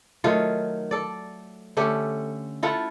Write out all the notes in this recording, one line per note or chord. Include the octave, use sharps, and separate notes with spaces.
D#3 F#3 A3 F4
A4 D5
D3 A3 C#4 G4
E4 F4 A4 F#5